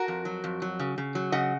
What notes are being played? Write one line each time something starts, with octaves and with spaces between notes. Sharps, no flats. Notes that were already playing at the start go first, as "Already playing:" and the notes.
Already playing: F#4 A#4
F2
F#3
F2
F#3
C#3
C#3
F#3
C#3 D#5 F#5